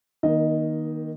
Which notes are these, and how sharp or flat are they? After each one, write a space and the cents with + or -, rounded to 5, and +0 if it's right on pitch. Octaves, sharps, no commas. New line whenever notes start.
D#3 +0 A#3 +35 D#5 +0